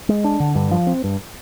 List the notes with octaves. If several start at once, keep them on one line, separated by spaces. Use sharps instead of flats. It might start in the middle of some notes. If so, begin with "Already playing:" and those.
G#3
D4
D3
G2
F3
C4
G2